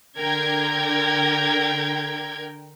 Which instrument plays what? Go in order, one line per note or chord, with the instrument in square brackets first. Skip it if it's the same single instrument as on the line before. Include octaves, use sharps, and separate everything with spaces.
[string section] D3 A#4 G5 G#6